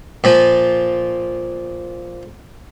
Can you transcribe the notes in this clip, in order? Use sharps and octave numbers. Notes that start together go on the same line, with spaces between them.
A#2 F3